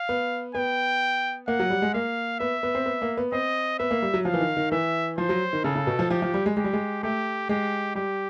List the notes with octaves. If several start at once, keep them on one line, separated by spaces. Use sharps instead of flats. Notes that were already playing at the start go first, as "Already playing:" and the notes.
Already playing: F5
B3
B3 G5
A#3 F#5
F#3
G3
G#3
A#3 F5
B3 E5
B3
C4
B3
A#3
B3
C4 D#5
B3 E5
A#3
G3
F#3
F3 F5
E3
D#3
D#3
E3 E5
F3 C5
F#3
D#3
C#3 A4
C#3
B2
F3
F3 G4
F3
G3
G#3
G#3 G4
G3
G#3
A3 G4
G#3 G4
G3 G4